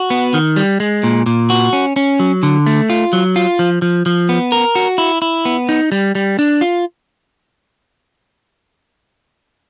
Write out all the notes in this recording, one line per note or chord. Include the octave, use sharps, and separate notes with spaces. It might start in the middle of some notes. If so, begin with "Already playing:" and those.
Already playing: F#4
B3
D#3
G3
G#3
A#2
A#2
F#4
C#4
C#4
F#3
D3
A3
F4
F#3
F4
F3
F3
F3
B3
A#4
F#4
E4
E4
B3
D#4
G3
G3
D4
F4